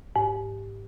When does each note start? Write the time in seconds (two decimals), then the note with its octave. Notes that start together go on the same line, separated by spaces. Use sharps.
0.16 G#2